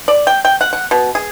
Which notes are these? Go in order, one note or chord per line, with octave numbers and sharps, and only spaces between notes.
D5
G5
G5
F#5
F#5
B2
G#4